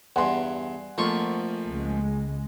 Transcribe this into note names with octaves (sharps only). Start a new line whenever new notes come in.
E2 G2 F#5 G#5 C6
F2 F3 A3 A#3 F4 C#6
C#2 G#3